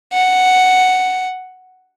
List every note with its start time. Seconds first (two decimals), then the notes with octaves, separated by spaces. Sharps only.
0.13 F#5